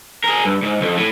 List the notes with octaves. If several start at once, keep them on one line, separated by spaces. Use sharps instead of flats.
G#4 A#4
G2
G#2
C2 F2
A2